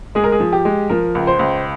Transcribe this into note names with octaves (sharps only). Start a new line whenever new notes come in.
G#3 G#4
A#4
G#4
F3
G4
G#3
F3 A#4
C#2
C5
C#2